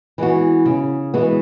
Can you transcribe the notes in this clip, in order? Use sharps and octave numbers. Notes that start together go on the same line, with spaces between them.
E3 G#3 B3 F#4
C#3
E3 G#3 B3 F#4